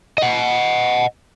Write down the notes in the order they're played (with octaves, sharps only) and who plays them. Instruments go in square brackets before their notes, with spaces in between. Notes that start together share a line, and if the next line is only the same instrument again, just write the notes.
[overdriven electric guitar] D#5 F#5